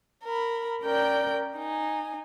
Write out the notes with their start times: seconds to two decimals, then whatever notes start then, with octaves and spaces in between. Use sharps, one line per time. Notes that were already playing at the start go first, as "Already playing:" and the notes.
0.25 A#4 B5
0.82 C#4 A#4 D5 G5 G6
1.55 D#4 G#5